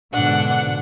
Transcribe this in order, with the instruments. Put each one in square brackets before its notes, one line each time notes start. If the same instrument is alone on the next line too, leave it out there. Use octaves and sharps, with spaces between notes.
[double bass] G#2 B2 [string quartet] D3 D4 [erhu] F#5